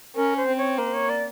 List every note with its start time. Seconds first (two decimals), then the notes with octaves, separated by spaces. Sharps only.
0.15 C#4 A#4
0.36 C5
0.47 C4
0.57 C#5
0.78 A#3 C5
0.93 C#5
1.09 D5